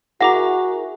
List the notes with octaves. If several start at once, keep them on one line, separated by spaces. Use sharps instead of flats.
E4 F#4 G#4 A#4 F#5 A#5 D6 A#6